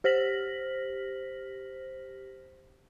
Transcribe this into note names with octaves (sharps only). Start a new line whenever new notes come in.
G4 C5 F6 A#6 B6 F#7